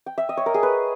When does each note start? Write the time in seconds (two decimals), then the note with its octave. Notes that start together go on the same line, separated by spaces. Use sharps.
0.06 G5
0.18 E5
0.29 D#5
0.37 C#5
0.46 A#4
0.54 G#4
0.63 B4